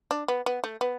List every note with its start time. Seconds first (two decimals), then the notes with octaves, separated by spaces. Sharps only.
0.11 D4
0.28 B3
0.46 B3
0.64 A3
0.81 B3